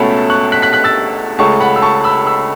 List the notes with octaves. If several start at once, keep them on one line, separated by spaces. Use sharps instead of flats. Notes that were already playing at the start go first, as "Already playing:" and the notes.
Already playing: C#2 B2 A3 C#4 E5 F#5 A5 B5
C#6 F#6
F#6 B6
F#6 B6
F#6 B6
E6 A6
C#2 C#3 A3 A5 C#6
F#5 B5
E6
A5 C#6
B5 E6
B5 E6